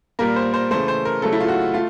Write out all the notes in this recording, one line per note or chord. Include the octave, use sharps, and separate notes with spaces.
A#2 G3 A#3 A#4
C5
C5
C#3 E3 A3 C5
C5
A#4
C#3 F#3 A3 A4
E4
F4
F#4
A3 F4